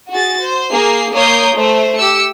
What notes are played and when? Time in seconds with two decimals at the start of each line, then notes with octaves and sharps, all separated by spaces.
0.10 F#4 G#4 A6
0.40 C5
0.71 A#3 G#4 C7
1.13 A#3 A#4 C#5 D#6 G6 C7
1.55 A3 C5
1.97 G4 E6 C#7